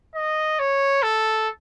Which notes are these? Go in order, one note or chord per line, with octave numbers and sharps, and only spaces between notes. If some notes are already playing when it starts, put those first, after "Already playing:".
D#5
C#5
A4